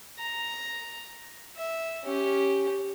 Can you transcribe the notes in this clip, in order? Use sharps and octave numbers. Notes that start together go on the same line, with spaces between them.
A#5
E5
C#4 G4